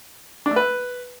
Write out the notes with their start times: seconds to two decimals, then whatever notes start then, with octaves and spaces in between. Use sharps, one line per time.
0.46 D4
0.51 A3
0.56 B4